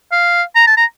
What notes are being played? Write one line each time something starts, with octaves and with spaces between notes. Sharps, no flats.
F5
A#5
A5
A#5